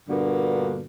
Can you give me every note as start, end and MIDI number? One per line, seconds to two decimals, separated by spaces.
0.09 0.84 43
0.09 0.84 46
0.09 0.84 50
0.09 0.84 58
0.09 0.84 59
0.09 0.84 66